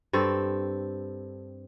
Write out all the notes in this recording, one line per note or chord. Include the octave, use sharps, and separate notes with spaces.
G2 C4 A4